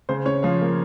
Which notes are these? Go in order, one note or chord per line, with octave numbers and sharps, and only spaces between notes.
C#3 C5
C#4 C#5
F3 F5
A#3